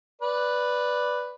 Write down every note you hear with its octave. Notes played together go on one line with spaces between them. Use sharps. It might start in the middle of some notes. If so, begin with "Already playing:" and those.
B4 D5